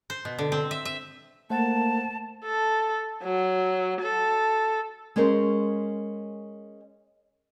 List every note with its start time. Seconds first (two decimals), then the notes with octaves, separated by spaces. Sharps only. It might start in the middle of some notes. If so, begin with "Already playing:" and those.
0.10 C5
0.25 B2
0.39 D3
0.52 C4
0.71 E5
0.85 E5
1.50 A3 A#3 C5 F#5 A5
2.45 A4
3.23 F#3
4.01 A4
5.16 G#3 C#4 G#4 A#4 C5